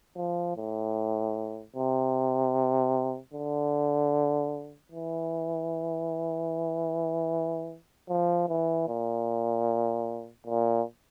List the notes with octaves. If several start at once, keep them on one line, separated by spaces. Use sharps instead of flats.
F3
A2
C3
D3
E3
F3
E3
A#2
A#2